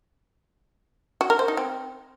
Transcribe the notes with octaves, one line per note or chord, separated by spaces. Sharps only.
F#4
A#4
C5
D#4
C4